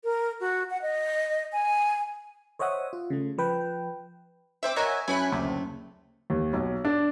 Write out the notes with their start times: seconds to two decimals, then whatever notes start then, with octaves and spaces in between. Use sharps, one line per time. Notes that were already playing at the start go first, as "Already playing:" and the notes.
0.04 A#4
0.40 F#4
0.70 F#5
0.82 D#5
1.52 G#5
2.59 C5 C#5 D#5 E5 F#5 D#6
2.93 F4
3.10 C#3 A3
3.38 F3 B4 G5
4.63 C4 C5 E5 D6 E6
4.76 F#4 A#4 C#5 D#5 E5 G#5
5.08 F#2 A3 C#4 E4 G#5 B5 F#6
5.32 F#1 D2 C3
6.30 D#2
6.53 B1
6.85 D4